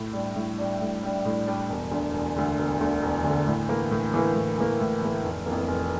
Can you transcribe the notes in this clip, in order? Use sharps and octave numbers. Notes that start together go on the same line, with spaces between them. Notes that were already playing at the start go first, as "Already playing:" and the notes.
Already playing: A2
G3 D4
A2
G3 D4
A2
G3 D4
A2
G3 D4
E1
D2 D3
E1
D2 D3
E1
D2 D3
E1
D2 D3
A2
E3 A#3
A2
E3 A#3
A2
E3 A#3
A2
E3 A#3
F1
F2 E3 A#3
F1